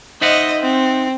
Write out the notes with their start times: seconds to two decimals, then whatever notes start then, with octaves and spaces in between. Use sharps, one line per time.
0.21 D#4 C5 D#5 E5 F#5
0.61 C4